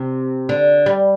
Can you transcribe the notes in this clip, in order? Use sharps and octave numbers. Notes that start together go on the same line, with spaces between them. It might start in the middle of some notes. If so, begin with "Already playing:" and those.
Already playing: C3
D3
G3